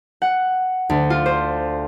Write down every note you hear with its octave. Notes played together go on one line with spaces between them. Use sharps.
F#5
D2
F4
C5